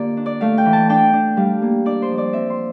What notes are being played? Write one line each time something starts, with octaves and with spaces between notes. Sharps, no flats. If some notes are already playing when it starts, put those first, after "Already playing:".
Already playing: D3 A#3 F4 G4 D5
D4
D5
A3 F5
G5
E3
A5
D4 G5
D4
G3 F5
A#3
D4 D5
C5
F3
D5
C4 E5
C6